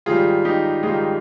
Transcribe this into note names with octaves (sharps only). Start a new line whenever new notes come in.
G#2 D#3 G3 F4 G#4
D#4 G4
G#2 D#3 G3 F4 G#4